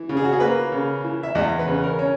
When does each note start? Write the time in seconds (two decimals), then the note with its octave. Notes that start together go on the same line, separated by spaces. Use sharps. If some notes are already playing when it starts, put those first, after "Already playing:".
Already playing: E3
0.09 C#3
0.17 G#4
0.25 F#4
0.33 G#4
0.40 A#3 B4
0.72 C#3
1.04 E3
1.23 E5
1.35 E2 D#5
1.59 B4
1.67 C#3
1.83 A#4
1.99 C#4